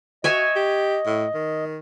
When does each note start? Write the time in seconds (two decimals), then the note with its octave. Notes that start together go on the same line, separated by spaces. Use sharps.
0.24 F#4 C#5 D#5 E5 G#5
0.56 G4
1.06 A2
1.34 D#3